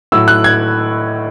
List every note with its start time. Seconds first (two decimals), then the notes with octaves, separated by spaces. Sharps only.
0.12 A2 F#3 A3 E6
0.28 F#6
0.44 G#6